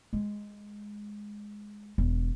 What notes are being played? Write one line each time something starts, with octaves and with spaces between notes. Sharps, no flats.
G#3
E1